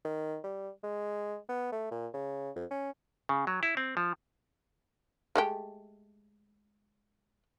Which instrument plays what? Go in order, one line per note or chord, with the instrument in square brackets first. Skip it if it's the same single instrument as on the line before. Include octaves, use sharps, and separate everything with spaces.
[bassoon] D#3
G3
G#3
B3
A3
A#2
C#3
F2
C#4
[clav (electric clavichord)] C#3
F#3
E4
C4
F3
[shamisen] G#3 A3 G4